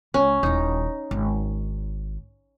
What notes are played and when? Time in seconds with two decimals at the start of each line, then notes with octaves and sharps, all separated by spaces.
0.14 C#2 C#4
0.43 D#1 D#4 E4
1.11 G#1